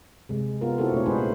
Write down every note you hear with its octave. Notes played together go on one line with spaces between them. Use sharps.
C3 G#3
B3 F4 A#4
C4 E4 F#4 G4 A4
A#2 A3 D4 C#5
G#3 D#4 G#4 B4 C5
A#3 D#4